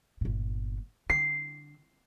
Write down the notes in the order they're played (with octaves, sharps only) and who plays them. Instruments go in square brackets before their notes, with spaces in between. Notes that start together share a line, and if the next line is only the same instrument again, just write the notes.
[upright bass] G1 A#2
[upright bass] D3 [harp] C7